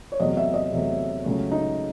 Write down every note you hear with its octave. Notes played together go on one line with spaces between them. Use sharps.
C#5
E2 C3 F#3 A3 D#5
E5
D#5
E2 C3 F#3 A3
C#2 C#3 F#3 A3
D#4